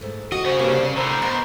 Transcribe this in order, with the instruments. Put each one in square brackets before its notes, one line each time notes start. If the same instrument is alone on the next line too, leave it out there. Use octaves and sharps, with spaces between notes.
[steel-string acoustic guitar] G#2 A3
[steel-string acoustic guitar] F#4 [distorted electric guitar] D#5
[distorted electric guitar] C#3 C#4 [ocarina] C5
[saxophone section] G2 A#3 [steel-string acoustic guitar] C3
[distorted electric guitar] A2 D3 [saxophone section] C5 [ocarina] A#5
[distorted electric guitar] B2 [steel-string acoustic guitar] A#4